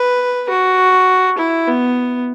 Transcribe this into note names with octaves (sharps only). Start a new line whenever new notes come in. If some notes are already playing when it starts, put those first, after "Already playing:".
Already playing: B4
F#4
E4
B3